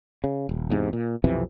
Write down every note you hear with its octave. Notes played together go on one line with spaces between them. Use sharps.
C#3
D#1
E2 G#2 C3
A#2
B1 F2 C3 E3